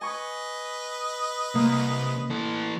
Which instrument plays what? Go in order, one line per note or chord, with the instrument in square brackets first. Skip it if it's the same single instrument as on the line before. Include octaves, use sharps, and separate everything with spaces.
[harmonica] B4 D#5 [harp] G#5 C#6
[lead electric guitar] C2 [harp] A#3
[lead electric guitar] E3 A4